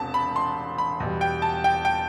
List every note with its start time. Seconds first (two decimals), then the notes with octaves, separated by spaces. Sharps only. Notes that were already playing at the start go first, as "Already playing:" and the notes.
Already playing: E1 E2 C3 A5
0.14 B5
0.36 C6
0.78 B5
1.00 E2 B2 G3
1.21 G5
1.42 A5
1.64 G5
1.85 G5